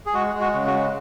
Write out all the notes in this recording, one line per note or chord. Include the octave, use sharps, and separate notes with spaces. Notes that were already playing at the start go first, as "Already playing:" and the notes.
G#4
G#3 F#4
G#3
F#4
C#3
F#4
G#3